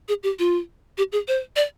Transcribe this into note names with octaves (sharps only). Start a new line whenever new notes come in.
G#4
G4
F4
G4
G#4
C5
D5